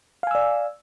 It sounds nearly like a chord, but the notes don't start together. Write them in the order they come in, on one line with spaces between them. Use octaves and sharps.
F5 G#5 E6 D5